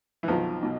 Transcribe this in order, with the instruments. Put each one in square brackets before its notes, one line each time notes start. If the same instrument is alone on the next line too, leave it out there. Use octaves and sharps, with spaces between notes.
[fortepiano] E3
[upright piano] B1 [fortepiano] D#3 F3
[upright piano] B2